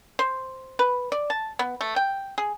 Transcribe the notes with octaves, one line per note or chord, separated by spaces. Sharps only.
C5
B4
D5
A5
B3
A3
G5
G#4